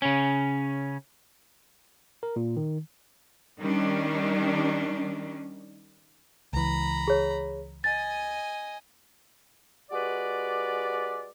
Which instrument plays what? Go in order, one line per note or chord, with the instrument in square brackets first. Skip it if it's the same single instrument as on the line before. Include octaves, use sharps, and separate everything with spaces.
[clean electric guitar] C#3 C#4
[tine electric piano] A#4
A#2
D#3
[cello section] D#3 G3 C#4 D4
[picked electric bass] C#2 E3 [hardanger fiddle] A#5 B5
[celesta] G#4 C#5
[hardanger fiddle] D#5 G#5 [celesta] A6
[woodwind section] G#3 F#4 G4 B4 D5